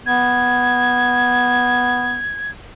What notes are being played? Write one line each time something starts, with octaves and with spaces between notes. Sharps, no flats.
B3 G#6